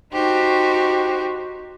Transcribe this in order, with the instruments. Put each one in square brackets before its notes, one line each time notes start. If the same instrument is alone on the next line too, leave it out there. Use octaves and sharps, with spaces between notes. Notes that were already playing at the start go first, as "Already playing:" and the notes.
[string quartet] D#4 F#4 G4 C5